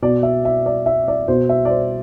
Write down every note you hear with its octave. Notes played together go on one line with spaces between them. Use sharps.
B2 D5
E5
E5
D5
E5
D5
B2 C5
E5
D5
C5